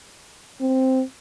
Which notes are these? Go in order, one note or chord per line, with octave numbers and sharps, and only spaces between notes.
C4